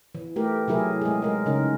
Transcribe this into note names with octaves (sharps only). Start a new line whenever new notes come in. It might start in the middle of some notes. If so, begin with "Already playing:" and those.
E3
A3 G4 A#4
C3 F#3 E4 G#4 A#4
G#3 G#4
G#3 A#4
C#3 C#4 D#4 A#4